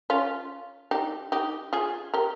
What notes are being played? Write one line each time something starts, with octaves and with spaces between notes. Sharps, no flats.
C#4 F4
D#4 G4
D#4 G4
F4 G#4
G4 A#4